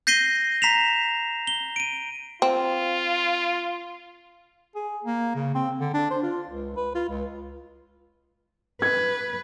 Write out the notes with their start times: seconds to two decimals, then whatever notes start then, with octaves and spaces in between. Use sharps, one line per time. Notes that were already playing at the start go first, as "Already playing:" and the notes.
0.07 G6 A#6 C7 D#7 G7
0.62 A#5 B6 C7 E7 F7
1.47 G7
1.76 D7 D#7
2.42 C4 F4
4.75 G#4
5.05 A#3
5.35 C#3
5.55 C4
5.79 D3
5.94 D4
6.11 C5
6.23 F4
6.49 C#2
6.77 B4
6.95 F4
7.09 C#2
8.82 B4 G#6